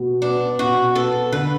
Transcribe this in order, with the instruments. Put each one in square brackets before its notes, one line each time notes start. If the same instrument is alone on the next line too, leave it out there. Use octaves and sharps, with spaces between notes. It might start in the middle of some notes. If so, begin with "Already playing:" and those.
Already playing: [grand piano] B2
[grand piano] B3 [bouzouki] D4
[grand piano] B2 [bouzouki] F#4
[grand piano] B3 [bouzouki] A4
[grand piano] D3 [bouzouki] B4